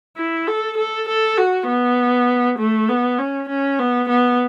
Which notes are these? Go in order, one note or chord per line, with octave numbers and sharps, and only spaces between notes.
E4
A4
A4
A4
F#4
B3
A3
B3
C#4
C#4
B3
B3